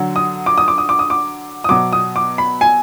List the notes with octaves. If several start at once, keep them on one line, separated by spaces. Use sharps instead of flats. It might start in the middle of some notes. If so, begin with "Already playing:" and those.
Already playing: D3 F#3
D#6
D6
D#6
D6
D#6
D6
D#6
D6
D#6
B2 F#3 D6
D#6
D6
B5
G#5